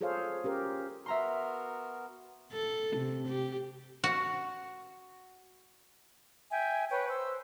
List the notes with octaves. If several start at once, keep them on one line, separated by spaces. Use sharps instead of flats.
F4 G#4 A4 C5 C#5 F5
C#4 G4 A#4
B3 F#4 A#4 E5 A#5 C6
A4
C3
G4
F#4
E5 G5 G#5
B4 C#5 G5 C#6
C5 E6